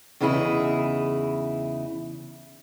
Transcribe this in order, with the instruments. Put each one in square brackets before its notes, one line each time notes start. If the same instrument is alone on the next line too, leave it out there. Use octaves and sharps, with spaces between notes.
[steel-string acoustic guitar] E2 C#3 D#4 E4 G#4